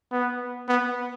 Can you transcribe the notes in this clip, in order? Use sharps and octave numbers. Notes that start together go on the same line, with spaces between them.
B3
B3